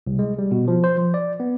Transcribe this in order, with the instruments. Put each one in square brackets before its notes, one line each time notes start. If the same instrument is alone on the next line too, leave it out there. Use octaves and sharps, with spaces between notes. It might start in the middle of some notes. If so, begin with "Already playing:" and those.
[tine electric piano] C2
G#3
G3
B2
F3
C5
F3
D5
B3